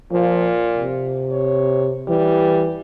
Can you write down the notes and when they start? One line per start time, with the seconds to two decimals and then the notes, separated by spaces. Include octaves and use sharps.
0.12 A#2 F3
0.78 C3
1.31 C#5
2.08 E3 G3